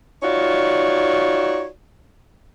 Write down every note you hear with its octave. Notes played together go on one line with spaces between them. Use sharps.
D#4 F4 F#4 C#5 D5